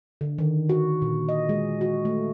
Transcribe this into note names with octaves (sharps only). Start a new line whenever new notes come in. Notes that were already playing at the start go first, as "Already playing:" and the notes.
D3
D#3
F#4
A#2
D#5
G#3
F#4
A3